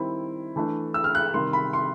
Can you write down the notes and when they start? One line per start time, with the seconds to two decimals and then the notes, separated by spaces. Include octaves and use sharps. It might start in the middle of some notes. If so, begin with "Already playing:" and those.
Already playing: D#3 G3 C4 E4
0.56 E3 A3 D4
0.94 E6
1.04 F6
1.15 F#6
1.34 C3 D#3 G3 C6
1.53 B5
1.73 C6